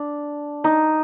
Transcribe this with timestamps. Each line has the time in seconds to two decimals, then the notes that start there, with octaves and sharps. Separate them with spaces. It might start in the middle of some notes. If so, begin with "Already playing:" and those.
Already playing: D4
0.64 D#4